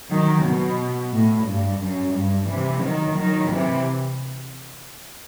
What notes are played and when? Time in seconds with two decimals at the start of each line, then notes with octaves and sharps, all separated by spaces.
0.12 D#3 F#3
0.47 B2
1.15 A2
1.48 G2
1.82 F#2
2.16 G2
2.50 C3 E3
2.83 D#3 F#3
3.17 D#3 F#3
3.51 C3 E3